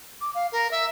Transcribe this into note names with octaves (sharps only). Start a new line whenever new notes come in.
D6
F5
A#4
E5